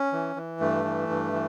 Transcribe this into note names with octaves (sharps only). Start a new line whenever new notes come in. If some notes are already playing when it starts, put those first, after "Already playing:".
Already playing: C#4
E3
E3
G2 A3
E3
G2
E3